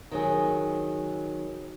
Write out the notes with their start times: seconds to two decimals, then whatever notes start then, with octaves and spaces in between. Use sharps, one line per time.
0.11 D#3 F#3 G#4